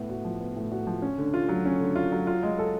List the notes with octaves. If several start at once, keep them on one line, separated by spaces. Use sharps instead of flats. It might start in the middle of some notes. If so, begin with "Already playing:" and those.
Already playing: A2 B3
F#4
F3
B3
A2
F#4
F3
C#4
D3
F4
F#3
C#4
D3
F4
F#3
F4
G#3
A4